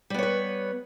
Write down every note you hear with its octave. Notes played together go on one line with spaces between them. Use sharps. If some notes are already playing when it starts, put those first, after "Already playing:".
G3 B3 B4 C#5